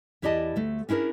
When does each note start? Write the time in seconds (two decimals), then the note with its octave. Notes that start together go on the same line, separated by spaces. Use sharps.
0.22 E2 E4 G4 D5 D#5 A5
0.56 D2 A3
0.89 C#4 D4 E4 G#4 A#4